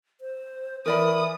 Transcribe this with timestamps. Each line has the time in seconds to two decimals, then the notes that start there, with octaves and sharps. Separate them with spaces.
0.21 C5
0.86 E3 A#4 D5 B5 D#6